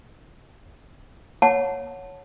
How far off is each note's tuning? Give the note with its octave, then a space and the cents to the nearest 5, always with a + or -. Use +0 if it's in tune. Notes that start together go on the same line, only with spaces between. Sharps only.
C#5 +0 F#5 -10 A5 +0